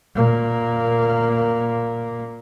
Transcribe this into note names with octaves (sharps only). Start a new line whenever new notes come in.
A#2 A#3